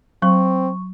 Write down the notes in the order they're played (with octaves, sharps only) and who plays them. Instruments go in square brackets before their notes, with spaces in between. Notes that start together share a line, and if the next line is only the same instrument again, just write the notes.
[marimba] F#3 [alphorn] C4 [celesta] C#6